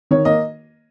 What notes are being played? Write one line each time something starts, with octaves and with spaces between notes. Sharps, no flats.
D#3 C#5
A#3 D#5